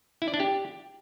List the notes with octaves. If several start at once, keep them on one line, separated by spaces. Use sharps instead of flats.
E4
D5
D4
G4